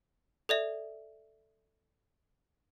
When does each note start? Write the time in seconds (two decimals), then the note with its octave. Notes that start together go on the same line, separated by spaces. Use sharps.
0.49 A4 D5 E5